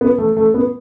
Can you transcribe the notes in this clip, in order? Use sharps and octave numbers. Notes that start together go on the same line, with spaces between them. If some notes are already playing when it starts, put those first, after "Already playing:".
B3
A3
A3
B3